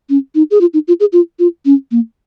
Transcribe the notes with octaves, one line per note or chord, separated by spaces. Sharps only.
C#4
D#4
G#4
F4
D#4
F4
G#4
F4
F4
C#4
A#3